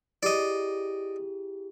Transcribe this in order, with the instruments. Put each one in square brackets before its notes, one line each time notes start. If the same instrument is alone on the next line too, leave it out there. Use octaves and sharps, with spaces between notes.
[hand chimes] E4 G4 G#4 [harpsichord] D5 D#5